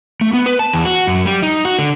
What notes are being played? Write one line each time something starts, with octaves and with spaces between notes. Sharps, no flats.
A3
B3
B4
A5
E2
F#4
F#2
G3
D#4
F#4
D3